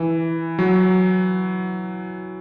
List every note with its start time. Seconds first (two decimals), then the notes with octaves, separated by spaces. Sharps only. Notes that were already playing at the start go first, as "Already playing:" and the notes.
Already playing: E3
0.59 F#3